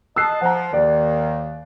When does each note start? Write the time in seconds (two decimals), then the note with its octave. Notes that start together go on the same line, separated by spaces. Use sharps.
0.16 D#5 A5 E6 F#6 C7
0.41 F3 F#5 A#5
0.73 D#2 D#3 D5